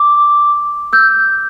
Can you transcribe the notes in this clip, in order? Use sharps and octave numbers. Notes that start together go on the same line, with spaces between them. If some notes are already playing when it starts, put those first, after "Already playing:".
Already playing: D6
E6 G6